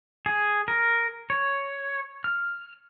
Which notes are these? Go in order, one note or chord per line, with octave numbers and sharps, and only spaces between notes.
G#4
A#4
C#5
F6